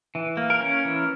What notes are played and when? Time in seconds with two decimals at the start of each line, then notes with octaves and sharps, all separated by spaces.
0.15 E3
0.37 A#3
0.50 A#4
0.60 C#4
0.85 E3